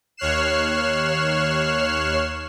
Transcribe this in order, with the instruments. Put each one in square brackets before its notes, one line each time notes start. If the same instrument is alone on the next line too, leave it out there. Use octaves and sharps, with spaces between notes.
[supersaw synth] D#2 C#5 F6 F#6 C7 E7